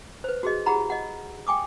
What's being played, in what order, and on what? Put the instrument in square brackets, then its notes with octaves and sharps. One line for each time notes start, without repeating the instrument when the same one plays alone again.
[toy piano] B4 C5
F#4 G#4 D#5
E4 G4 G#4 F#5 A#5 B5
D#5 F#5
G5 G#5 D6 D#6